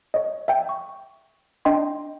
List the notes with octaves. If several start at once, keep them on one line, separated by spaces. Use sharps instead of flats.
C#5 D#5
E5 G5
C#6
D4 D#5 G5 C6